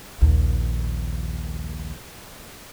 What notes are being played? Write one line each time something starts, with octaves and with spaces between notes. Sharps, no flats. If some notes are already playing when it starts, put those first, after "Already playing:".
A#1 D#2